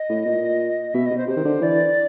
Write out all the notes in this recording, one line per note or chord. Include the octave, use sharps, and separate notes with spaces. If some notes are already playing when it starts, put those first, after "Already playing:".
Already playing: D#5
A2
A#2
B2 E5
D#5
B2
C5
C3 C5
D#3
D3
E3 D5